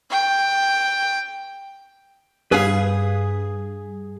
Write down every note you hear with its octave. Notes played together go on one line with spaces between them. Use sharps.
G5
G2 G#4 B4 F5